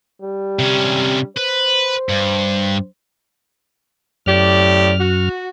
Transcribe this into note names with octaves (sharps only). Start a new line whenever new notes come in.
G3
C3 C#4
B4 C5
G2
F#2 A2 G4 D5 F6
F#4